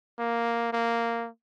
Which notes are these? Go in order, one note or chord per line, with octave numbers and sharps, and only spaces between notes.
A#3
A#3